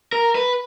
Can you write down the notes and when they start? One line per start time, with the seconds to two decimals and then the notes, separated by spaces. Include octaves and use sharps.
0.13 A#4
0.35 B4